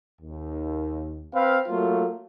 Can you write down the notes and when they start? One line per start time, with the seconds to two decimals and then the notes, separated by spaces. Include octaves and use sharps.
0.20 D#2
1.34 C4 B4 F5
1.67 F#3 A3 A#3 F4